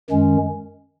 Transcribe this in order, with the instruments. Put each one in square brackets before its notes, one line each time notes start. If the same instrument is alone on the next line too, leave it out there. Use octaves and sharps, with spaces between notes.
[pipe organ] F#2 D#3 G#3 C#4